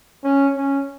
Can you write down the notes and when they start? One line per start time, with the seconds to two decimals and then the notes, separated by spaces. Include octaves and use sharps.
0.24 C#4
0.56 C#4